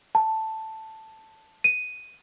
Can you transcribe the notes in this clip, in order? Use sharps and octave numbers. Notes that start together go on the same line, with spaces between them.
A5
D#7